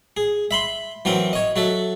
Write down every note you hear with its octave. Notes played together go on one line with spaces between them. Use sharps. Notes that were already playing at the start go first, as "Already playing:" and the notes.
G#4
E5 B5 C6
E3 F#3 C4 A#4
C#5 D#5
F#3 F#4 A4 E5